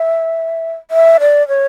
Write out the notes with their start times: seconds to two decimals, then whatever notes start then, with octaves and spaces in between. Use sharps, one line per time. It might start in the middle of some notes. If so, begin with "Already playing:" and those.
Already playing: E5
0.91 E5
1.20 D5
1.48 C#5